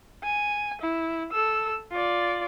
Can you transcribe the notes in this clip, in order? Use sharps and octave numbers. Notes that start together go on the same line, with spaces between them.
G#5
E4
A4 E6
F4 D5